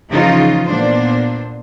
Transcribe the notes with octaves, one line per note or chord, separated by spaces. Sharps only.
C#3 E3 F3 D#4 F4
A#2 B3 D4 C5